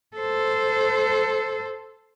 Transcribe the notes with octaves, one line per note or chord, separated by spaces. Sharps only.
A4 C5